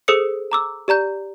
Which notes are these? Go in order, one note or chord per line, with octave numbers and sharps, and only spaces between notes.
G#4 A4 C5 D#6 E6 C#7
A#5 D6 E6
G4 D5 A#5 G6